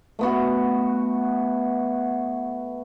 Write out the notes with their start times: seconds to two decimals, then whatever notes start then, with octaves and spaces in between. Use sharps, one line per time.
0.19 A3 B3 F#4